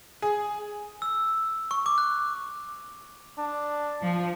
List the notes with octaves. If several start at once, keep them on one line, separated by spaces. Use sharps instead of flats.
G#4
E6
C#6
D6
F#6
D4
F3